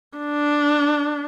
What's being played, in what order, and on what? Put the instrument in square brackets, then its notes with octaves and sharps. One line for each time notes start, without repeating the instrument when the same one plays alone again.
[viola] D4